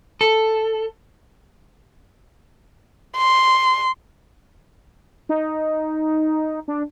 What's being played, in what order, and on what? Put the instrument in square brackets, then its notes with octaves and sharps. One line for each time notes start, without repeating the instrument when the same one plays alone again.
[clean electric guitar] A4
[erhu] C6
[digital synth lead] D#4
D4